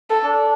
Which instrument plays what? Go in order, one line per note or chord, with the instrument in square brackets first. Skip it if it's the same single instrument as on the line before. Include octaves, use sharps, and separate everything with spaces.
[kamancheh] A4
[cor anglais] D4